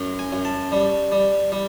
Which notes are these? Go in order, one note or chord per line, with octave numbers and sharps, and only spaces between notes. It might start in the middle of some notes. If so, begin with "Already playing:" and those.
Already playing: F#2
G#5
F#2
A5
G3
G3
G3